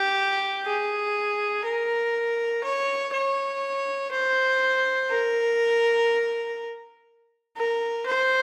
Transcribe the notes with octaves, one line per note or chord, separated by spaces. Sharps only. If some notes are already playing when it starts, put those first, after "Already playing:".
Already playing: G4
G#4
A#4
C#5
C#5
C5
A#4
A#4
C5